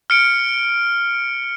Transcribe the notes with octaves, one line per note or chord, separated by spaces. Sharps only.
F6 C#7 D7